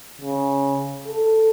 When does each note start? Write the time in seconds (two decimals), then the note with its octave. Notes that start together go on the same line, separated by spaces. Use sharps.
0.21 C#3
1.07 A4